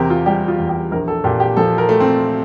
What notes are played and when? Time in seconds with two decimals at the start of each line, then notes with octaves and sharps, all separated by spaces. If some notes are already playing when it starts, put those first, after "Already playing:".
Already playing: E2 C3 G4 A#4 C5
0.10 F4
0.26 G3 G4
0.48 F4
0.59 E2
0.69 G4
0.91 A#1 A#4
1.08 A4
1.24 A#2 G4
1.40 G4
1.57 F3 A4
1.78 A#4
1.89 A3
2.00 C4